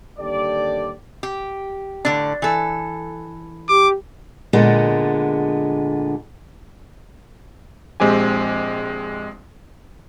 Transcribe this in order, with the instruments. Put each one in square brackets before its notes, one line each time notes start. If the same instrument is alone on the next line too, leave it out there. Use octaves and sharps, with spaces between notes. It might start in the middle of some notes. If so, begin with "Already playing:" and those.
[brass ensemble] D#2 D3 G3 G4 A4 D5
[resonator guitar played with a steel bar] G4
A2 D3 D4
E3 A4
[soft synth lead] G4 [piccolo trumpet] D6
[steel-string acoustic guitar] A#2 D3 G#3 B3
[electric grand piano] A#1 G#3 C4 G4 G#5